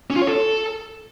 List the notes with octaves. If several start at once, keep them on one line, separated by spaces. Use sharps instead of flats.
C#4
F4
C#5
A4